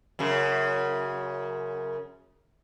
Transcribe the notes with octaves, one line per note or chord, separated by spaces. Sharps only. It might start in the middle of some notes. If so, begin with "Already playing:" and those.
F#2 C#3